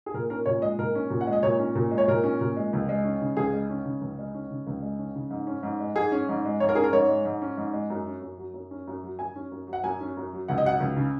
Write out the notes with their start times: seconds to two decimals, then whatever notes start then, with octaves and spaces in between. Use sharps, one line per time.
0.06 G#4
0.14 A#2 A#4
0.30 C#4 A#4
0.46 A#2 C#5
0.62 G#3 D#5
0.79 A#2 A#4
0.95 C#4
1.10 A#2
1.21 F#5
1.27 G#3
1.33 D#5
1.43 A#2 C#5
1.59 C#4
1.75 A#2
1.91 G#3
1.98 C#5
2.08 A#2 A#4
2.24 C#4
2.41 A#2
2.56 G#3
2.73 C#2
2.89 G#3
3.04 C#4
3.21 C#3
3.37 C#2 G#4
3.53 G#3
3.69 C#4
3.85 C#3
4.01 C#2
4.19 G#3
4.35 C#4
4.51 C#3
4.67 C#2
4.82 G#3
4.99 C#4
5.15 C#3
5.31 G#2
5.47 C#4
5.63 G#2
5.80 G#3
5.95 G#2 G#4
6.12 C#4
6.29 G#2
6.45 G#3
6.60 G#2 C#5
6.69 A#4
6.75 C#4 G#4
6.84 A#4
6.93 G#2 C#5
7.09 G#3
7.25 G#2
7.42 C#4
7.57 G#2
7.73 G#3
7.90 F#2
8.06 C#4
8.22 F#2
8.38 F#3
8.54 F#2
8.71 C#4
8.87 F#2
9.03 F#3
9.19 F#2 G#5
9.36 C#4
9.52 F#2
9.67 F#3
9.73 F#5
9.84 F#2 G#5
10.01 C#4
10.17 F#2
10.33 F#3
10.48 C#2 F#5
10.58 D#5
10.65 F#3 F#5
10.80 C#2
10.96 C#3